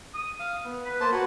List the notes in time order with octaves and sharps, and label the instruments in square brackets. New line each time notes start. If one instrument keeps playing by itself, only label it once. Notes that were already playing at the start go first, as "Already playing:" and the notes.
[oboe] D#6
[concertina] F5
B3
[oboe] B4
[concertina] A#3 C5 A5
[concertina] F#4 B4 [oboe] C#5